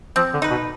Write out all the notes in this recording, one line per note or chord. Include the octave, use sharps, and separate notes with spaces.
F3 C4
D3
D#4 B4
B2